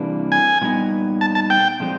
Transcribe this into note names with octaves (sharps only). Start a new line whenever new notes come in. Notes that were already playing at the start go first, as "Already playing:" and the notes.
Already playing: C3 E3 G3 A#3 D4
G#5
A#2 G3 B3 D#4
A5
A5
G5
A#2 F3 G#3 C4